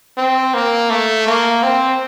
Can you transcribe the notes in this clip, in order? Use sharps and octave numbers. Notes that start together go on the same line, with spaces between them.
C4
A#3
A3
A#3
C4